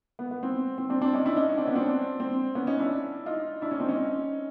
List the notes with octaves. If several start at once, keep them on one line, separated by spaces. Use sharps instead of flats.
B3
B3
C4
C4
C4 D4
C4 D4
C#4 D#4
D4 E4
C#4 D#4
C#4 D#4
C4 D4
B3 C#4
C4 D4
C4
B3 C#4
C#4 D#4
D4 E4
D#4 F4
D4 E4
C#4 D#4
C4 D4
C#4 D#4